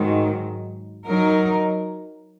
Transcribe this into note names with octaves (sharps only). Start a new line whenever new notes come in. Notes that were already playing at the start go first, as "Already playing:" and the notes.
Already playing: G#2 D#3 F#3
F#3 D#4 A#4